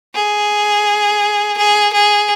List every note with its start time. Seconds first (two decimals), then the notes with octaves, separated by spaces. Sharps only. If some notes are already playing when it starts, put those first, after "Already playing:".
0.15 G#4
1.57 G#4
1.93 G#4